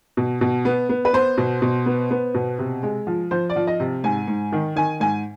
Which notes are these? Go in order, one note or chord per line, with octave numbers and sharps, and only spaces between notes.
B2
B2
B3
B3
B4
B3 C5
B2
B2
B3
B3
B2
C3
G#3
F3
F3 C5
D5
F3
D#5
C3
G#2 G#5
G#2
D#3
D#3 G#5
G#2 G#5